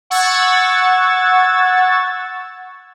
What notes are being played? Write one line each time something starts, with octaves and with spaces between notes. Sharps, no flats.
F#5 C#6 E6 G#6 A6